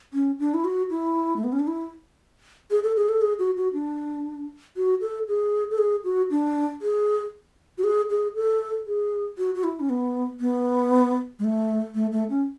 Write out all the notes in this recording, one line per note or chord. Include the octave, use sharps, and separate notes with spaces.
C#4
D4
E4
F#4
E4
A3
B3
C#4
D4
E4
G#4
A4
G#4
A4
G#4
F#4
F#4
D4
F#4
A4
G#4
A4
G#4
F#4
D4
G#4
F#4
G#4
G#4
A4
G#4
F#4
F#4
E4
C#4
B3
B3
G#3
A3
A3
A3
C#4